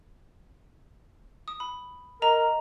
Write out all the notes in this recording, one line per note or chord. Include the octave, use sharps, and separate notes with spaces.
D#6
B5
A#4 D#5 A#5